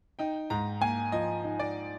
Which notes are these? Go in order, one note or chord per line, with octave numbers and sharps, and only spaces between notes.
D#4 G5
G#2 A#5
A#3 G#5
F3 D#5
D#4
D5